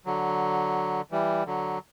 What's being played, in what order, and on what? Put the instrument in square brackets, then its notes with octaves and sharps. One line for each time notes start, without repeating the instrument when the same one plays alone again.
[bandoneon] D3 F#3
E3 G3
D3 F#3